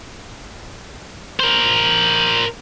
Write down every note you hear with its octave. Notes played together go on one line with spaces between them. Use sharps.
A#4 C5